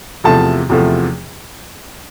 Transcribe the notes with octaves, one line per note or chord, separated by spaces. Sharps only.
E2 C3 F3 A3 A5
E2 C3 F3 A3